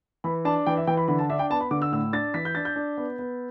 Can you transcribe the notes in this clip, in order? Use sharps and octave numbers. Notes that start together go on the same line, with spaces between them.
E3 B5
D4 A5
E3 G5
E5
E3 G5
B5
D3 B5
A5
D4 E5
G5
B3 A5
B5
D3 D6
E6
A2 E6
D4 A6
E3 B6
G6
D4 A6
G6
D4
B3
B3